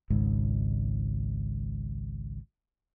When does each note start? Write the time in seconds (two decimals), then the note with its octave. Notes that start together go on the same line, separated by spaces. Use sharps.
0.10 G#1 C#2 G#2